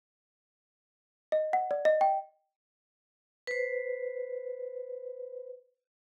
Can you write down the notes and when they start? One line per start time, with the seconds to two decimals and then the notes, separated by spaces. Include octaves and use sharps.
1.32 D#5
1.53 F#5
1.71 D5
1.85 D#5
2.01 G5
3.47 B4 C5